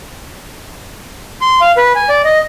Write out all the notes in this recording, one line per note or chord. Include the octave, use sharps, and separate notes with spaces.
C6
F5
B4
G#5
D5
D#5